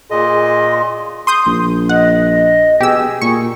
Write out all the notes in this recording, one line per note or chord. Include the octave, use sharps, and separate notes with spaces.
A#2 G#4 D#5 C6
C6 D#6 G6
A#1
D#5 F#5
B2 G4 G#4 E6
A#2 C#6